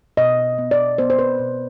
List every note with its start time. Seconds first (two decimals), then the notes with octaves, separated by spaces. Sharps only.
0.17 B2 D#5
0.58 B3
0.71 D5
0.98 B3 C5
1.10 C5
1.19 B4
1.39 B2